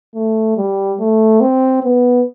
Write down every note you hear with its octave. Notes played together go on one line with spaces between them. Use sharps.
A3
G3
A3
C4
B3